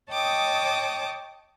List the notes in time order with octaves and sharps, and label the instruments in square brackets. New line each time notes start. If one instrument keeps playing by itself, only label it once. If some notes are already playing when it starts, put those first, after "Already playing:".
[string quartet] C#5 D#5 G5 A5 D6 D#6